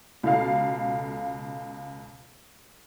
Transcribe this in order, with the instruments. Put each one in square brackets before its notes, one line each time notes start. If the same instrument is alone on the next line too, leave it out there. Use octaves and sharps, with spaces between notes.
[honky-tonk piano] C#2 B2 A4 F5